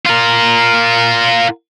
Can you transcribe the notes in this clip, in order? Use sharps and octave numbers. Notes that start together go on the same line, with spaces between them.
F4 A#4